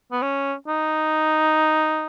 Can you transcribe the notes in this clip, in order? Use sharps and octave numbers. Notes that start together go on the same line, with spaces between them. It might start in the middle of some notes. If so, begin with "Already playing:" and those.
B3
C#4
D#4